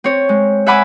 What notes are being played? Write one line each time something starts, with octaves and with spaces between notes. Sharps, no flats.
C4 C#5
G#3
E5 F#5 G#5 B5 D6 E6